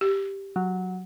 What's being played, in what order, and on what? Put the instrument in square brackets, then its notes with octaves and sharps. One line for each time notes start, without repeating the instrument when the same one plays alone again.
[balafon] G4
[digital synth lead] F#3